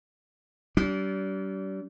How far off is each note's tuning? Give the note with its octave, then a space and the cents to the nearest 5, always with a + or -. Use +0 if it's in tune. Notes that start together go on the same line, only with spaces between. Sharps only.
G3 -35 D4 -40